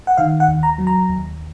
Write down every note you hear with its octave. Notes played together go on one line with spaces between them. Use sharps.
F#5
D#3 F5
F#5
D#2
A#5
F#3
A#5
D#2